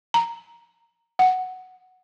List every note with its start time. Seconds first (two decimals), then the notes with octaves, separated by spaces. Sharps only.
0.14 A#5
1.19 F#5